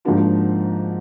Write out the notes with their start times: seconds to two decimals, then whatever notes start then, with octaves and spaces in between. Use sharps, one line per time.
0.05 G#2 F3 A#3 D4 F#4